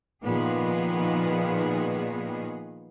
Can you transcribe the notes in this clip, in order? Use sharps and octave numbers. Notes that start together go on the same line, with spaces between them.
A#2 D#3 F3 B3 G#4